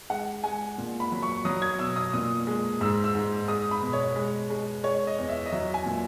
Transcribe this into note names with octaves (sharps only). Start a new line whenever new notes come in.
G#3 F#5
G#3 G#5
A#2
B5
F#3
C#6
F#3 D#6
G#6
B2 E6
D#6
A#2 D#6
G#3
G#2 E6
E6
G#2
G#3 D#6
B5
B2
C#5
G#3
G#3
G#3 C#5
D#5
E2
E5
D#5
F#3 E5
G#5
A#2